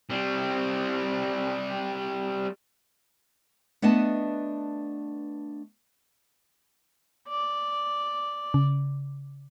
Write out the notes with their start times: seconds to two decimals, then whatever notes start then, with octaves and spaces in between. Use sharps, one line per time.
0.10 G3 C4
3.82 A3 B3 D4 B4 D#5 A5
7.28 D5
8.54 C#3